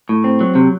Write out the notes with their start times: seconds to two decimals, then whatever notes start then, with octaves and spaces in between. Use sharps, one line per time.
0.09 A2
0.24 C4
0.41 F#3
0.55 C3